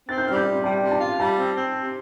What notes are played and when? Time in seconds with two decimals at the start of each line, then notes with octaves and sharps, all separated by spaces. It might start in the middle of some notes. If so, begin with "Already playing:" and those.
0.09 C4 A6
0.18 G6
0.27 G3 F6
0.36 G6
0.46 C3
0.64 G3 A5
0.82 C3
0.91 A5
1.01 F4
1.19 G3 A5
1.38 C4
1.57 C4
1.75 C3